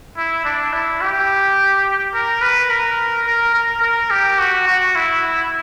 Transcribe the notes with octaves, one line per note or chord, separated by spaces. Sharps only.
E4
D4
E4
G4
A#4
B4
A#4
A#4
A#4
A#4
G4
F#4
F#4
E4